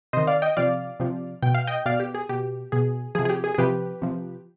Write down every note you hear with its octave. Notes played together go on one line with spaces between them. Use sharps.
C3 D#3 C5 D#5
D5 F5
D#5 G5
C3 F3 D5 F5
C3 F3
B2 G5
F5
D#5 G5
B2 D5 F5
G4
G#4
B2 G4
B2 G#4
C3 F3 G#4
G#4
G4
G#4
G#4
C3 F3 G4 B4
C3 F3